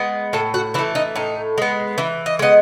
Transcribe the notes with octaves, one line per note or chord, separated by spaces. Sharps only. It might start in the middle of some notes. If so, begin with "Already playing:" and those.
Already playing: G#3 B3
A2 A4
F#4
E3 A3 E4
D#4
A2 D#4
G#3 B3
E3 E4
D#5
G#3 B3 D#5